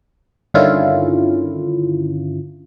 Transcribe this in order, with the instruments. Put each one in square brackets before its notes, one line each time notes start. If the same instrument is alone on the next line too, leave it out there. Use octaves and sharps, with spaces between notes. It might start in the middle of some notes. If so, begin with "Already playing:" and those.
[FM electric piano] G2 D3 D#3 C#4 E4 F4